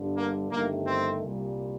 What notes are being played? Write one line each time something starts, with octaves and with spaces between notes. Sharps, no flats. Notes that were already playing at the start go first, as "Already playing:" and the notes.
Already playing: G1 G2 D3
A#3
G1 G2 D#3 A3 A#3
C4
C2 A#2 G3